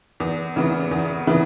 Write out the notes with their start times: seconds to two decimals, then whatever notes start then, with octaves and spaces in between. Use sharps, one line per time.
0.20 E2
0.56 C#3 E3 B3
0.91 E2
1.27 C#3 E3 B3